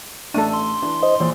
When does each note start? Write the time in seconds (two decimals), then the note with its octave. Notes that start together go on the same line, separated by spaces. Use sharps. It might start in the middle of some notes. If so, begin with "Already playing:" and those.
0.34 A1 A3 D4 A4 D#7
0.53 C6
0.82 E3 D4
1.03 C5 D#5
1.20 A#1 E3 C5 D5